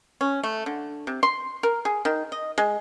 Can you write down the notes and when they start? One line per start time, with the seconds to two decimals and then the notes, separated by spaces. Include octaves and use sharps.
0.21 C#4
0.44 A3
0.66 D3
1.07 C3
1.23 C6
1.63 A#4
1.85 G#4
2.05 D#3
2.32 D#5
2.58 G#3